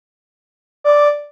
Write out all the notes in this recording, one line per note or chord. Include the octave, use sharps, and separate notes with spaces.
D5